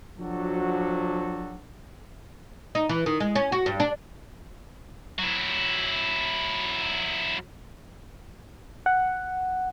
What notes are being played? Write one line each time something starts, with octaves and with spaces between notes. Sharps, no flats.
F3 F#3 D4 F#4 G4 A4
D#4
E3
D#3
G#3
C#4
F#4
G2
D4
F#3 E4
F#5